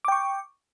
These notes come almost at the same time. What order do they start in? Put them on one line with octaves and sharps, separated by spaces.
D6 G5 C#6